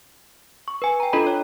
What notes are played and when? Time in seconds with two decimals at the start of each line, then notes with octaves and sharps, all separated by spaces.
0.68 C#6
0.82 B4 G#5
1.00 G5 A#5
1.13 D4 F4 A4 D#5 A#5 B5
1.27 C#5